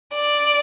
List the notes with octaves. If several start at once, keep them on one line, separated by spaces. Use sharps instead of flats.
D5